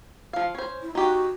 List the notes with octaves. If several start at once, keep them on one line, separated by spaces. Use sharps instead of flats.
F3 F5
C#4 C5
E4
D#4 F#4 G4